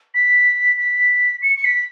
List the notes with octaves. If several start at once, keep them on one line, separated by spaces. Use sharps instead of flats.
B6
B6
C#7
C#7
B6